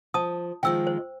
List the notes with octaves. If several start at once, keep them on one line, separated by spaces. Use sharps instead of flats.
F3 A5 D#6
D#3 F3 G#3 G5 E6
C5